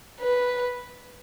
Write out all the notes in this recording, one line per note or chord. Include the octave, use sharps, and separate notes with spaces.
B4